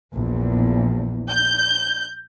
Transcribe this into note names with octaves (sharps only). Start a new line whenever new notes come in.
A#1 E2
G6